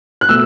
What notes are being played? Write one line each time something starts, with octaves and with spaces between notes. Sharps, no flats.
F#6
B2 A3 E6